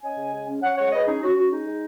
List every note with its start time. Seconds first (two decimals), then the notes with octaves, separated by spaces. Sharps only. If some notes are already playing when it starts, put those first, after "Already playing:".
0.03 C#4 D#5 G#5
0.18 C#3
0.33 G#3
0.48 C#4
0.62 C#4 C#5 F#5
0.77 G#3 C#5 F#5
0.91 G#3 B4 D#5
1.06 C#4 D#4 G#4
1.21 C#4 F#4
1.36 C#4 F#4
1.51 G#3 D#4
1.66 G#3